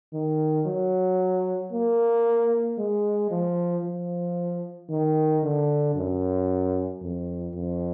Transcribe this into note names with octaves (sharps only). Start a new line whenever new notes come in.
D#3
F#3
A#3
G#3
F3
F3
D#3
D3
F#2
F2
F2